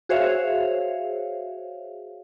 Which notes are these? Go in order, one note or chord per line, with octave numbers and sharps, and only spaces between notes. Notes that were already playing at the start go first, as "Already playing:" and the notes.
F#4 G#4 C5 C#5 E5 F5